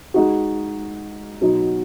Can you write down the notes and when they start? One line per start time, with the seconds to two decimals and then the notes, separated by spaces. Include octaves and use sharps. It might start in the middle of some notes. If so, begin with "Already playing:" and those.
0.14 G#3 D#4 F#4
1.41 B2 F#3 B3 D#4 F#4